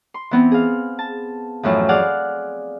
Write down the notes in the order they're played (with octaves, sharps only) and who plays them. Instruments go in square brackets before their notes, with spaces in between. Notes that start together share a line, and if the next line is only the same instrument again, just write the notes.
[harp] C6
E3 B3 C4
G#4 F5
A5
F#2 A2 E3 F3
G#4 D5 F5 F#5